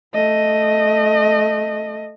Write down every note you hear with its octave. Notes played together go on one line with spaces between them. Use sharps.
A3 D#5